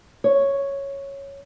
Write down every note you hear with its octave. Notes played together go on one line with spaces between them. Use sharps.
C#5